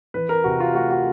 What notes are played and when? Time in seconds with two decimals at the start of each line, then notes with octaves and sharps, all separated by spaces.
0.14 E3 B4
0.29 A#4
0.44 C3 F#4
0.60 F4
0.74 A3 F#4
0.91 F#4